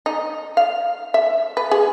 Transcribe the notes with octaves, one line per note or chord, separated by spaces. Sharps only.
D#4
F5
E5
B4
G#4